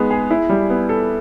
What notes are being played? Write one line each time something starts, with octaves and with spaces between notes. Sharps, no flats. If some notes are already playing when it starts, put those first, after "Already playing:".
Already playing: G#3 B3 D#4
G#4
E4
G3
B3
A4